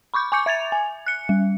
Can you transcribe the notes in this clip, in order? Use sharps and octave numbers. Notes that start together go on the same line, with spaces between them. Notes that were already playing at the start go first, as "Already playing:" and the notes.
B5 C#6 D6 G6
G#5 C#6 D6 G6 C#7
E5 G#6 A6 F7
G#5
F#6 C#7
G3